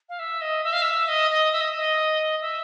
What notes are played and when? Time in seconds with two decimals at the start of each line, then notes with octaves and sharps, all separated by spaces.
0.09 F5
0.19 E5
0.41 D#5
0.64 E5
0.73 F5
0.82 E5
1.08 D#5
1.31 D#5
1.53 E5
1.61 D#5
1.77 D#5
2.41 E5